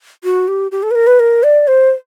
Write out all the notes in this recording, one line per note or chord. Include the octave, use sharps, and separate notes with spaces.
F#4
G4
G4
A4
B4
A#4
B4
A#4
D5
C5